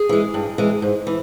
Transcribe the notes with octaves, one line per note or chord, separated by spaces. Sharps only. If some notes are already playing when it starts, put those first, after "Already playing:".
Already playing: G#4
E3 G#3
G2
E3 G#3
G#2
E3